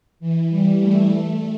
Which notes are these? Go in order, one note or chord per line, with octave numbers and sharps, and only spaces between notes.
E3
G3
A3
A3